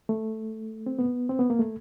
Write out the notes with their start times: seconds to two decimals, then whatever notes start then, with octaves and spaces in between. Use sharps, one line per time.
0.09 A3
0.86 C4
0.99 B3
1.29 C4
1.39 B3
1.50 A#3
1.59 A3